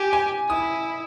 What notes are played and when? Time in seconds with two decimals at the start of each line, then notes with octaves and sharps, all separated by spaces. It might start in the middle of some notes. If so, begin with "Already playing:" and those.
Already playing: G4 G#5
0.13 G#5
0.50 E4 D#6